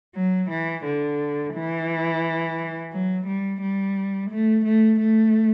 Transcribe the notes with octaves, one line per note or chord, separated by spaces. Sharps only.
F#3
E3
D3
E3
F#3
G3
G3
A3
A3
A3